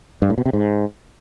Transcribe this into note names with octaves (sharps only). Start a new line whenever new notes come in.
G2
A2
B2
C3
G#2